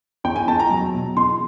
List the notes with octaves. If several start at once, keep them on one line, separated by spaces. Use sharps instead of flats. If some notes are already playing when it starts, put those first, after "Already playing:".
E2 G5
G#5
E2 A5
A#5
F#3
B2
E2 C6